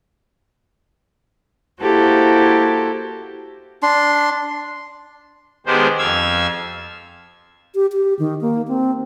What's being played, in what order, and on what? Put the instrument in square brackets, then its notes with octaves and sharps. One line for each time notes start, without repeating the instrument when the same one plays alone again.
[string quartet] A#3 E4 F#4 G4 A4 C5
[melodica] D4 C6
[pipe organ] D#3 G#3 B3 D4 G4 C5
F2 F5 E6 G#6
[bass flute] G4
G4
D#3
A#3
C4